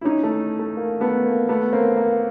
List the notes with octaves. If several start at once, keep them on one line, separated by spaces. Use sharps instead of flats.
E4
C#4 D#4
A3
A3
A#3
A3 B3
A#3
A3 B3
A#3 C4
A#3